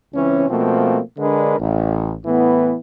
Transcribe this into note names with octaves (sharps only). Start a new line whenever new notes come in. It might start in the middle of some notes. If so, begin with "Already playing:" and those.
C#2 E3 C4 C#4
B2 F3 A3 A#3 C4
D3 G#3 D4 A#4 B4
A1
A2 E3 B3